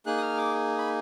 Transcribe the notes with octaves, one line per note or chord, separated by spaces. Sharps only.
A#3 D#4 G#4 F#6
D#6
F6
D6
B5